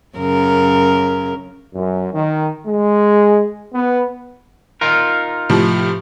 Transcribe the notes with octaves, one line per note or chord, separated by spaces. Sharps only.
F#2 C#3 A#4
F#2
D#3
G#3
B3
D#4 F4 A#4
A2 C3 F3